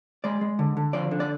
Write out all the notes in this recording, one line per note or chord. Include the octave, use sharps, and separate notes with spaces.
G#3 D5
G#3
D3
D3
F3 D5
D3
D5